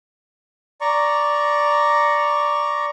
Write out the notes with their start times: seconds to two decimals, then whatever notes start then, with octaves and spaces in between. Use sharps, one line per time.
0.81 D5 A#5 C#6